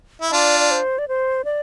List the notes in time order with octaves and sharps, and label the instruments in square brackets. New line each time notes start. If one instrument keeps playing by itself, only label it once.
[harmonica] E4
[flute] E5
[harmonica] D4 F4 [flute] D5
[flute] D5
C5
D5
C5
D5